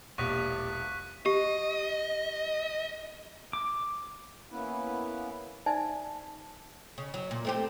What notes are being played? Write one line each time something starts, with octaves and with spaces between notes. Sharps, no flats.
E1 A#1 G4 C#6 F#6 B6
G4 D#5
D6
A#3 B3 C#4 E4 B4
D#4 C5 D5 E5 G#5 A5
C#3
F#3
A#2
A3 C4 G4